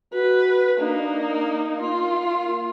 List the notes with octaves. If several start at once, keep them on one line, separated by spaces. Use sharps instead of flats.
F#4 B4
A#3 D4 D#4
A#3 F4